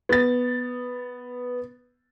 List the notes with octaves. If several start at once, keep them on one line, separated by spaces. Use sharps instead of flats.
B3 A6